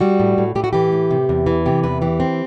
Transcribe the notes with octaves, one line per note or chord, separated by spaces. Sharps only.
G3 F#4
A2
A2
A2 G4
F#4
E3 G4
A2
C3
E2
E3
C3 G4
E2 B4
E3 G4
C4